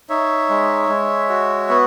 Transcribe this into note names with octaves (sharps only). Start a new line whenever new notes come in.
D#4 C#5 E5
G#3
G#3
F#4
B3